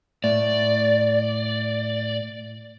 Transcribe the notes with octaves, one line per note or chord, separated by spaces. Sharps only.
A2 D5